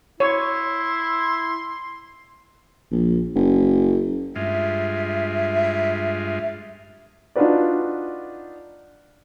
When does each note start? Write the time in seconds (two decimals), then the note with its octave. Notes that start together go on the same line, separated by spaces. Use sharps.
0.20 E4 C#5 C6
2.91 A#1
3.35 F#1
4.36 G2 G#3 F4 E5
7.36 D4 D#4 F4 F#4 B4 D5